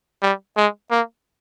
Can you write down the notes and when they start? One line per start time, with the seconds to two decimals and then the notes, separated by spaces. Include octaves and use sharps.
0.22 G3
0.57 G#3
0.91 A#3